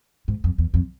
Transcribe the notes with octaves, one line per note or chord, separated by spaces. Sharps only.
G#2
F2
E2
F2